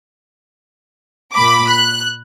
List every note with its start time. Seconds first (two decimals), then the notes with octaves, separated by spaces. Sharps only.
1.34 A#2 B5 D6
1.69 F#6